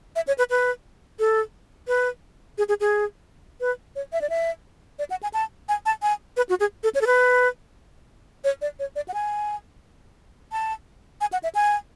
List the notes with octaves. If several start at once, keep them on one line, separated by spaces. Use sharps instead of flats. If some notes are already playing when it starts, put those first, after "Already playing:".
E5
C#5
B4
B4
A4
B4
G#4
G#4
G#4
B4
C#5
E5
D5
E5
D5
F#5
G#5
A5
G#5
A5
G#5
B4
F#4
G#4
A4
C#5
A4
B4
C#5
D5
C#5
D5
F#5
G#5
A5
G#5
F#5
E5
G#5